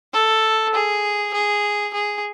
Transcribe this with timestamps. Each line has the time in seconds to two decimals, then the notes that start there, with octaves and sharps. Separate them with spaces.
0.13 A4
0.74 G#4
1.34 G#4
1.93 G#4